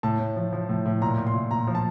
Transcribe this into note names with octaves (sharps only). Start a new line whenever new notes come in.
A2 A5
A2
F3
F3
A2
A2
A#2 A#5
A#2
C6
A#2
A#2 A#5
F3
A5